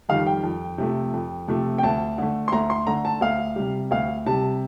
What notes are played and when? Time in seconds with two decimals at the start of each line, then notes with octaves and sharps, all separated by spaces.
0.09 F2 D#3 G3 F5
0.27 G5
0.43 F2
0.78 C3 F3 A3
1.14 F2
1.48 C3 F3 A3
1.78 G5
1.83 D2 A5
2.18 D3 A3
2.48 C6
2.52 D2 A#5
2.70 C6
2.86 D3 A3 A#5
3.05 A5
3.21 D2 F5
3.56 C3 G3
3.91 D2 F5
4.26 C3 G3 A5